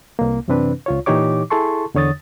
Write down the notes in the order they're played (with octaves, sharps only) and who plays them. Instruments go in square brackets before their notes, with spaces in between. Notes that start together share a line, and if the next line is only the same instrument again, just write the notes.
[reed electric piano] C2 A#3
F#2 C3 E3 C4 D4 B4
C#2 F4 C#5
A#2 E3 D#4 G4 C#5 D6
E4 G#4 A4 A5 C6 C#6
E2 D3 C#5 D#6 A6